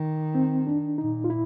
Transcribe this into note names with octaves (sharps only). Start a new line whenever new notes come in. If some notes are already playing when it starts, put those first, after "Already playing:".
Already playing: D#3
C4
D4
A#2 D#4
F4
E4